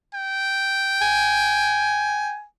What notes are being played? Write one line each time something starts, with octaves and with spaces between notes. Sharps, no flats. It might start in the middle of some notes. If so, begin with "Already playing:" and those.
G5
G#5